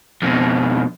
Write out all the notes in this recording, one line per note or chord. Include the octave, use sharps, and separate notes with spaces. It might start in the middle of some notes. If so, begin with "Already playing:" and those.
F2 B2